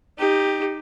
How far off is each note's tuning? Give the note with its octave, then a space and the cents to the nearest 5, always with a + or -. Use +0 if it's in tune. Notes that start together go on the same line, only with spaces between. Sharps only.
D#4 +0 G4 +10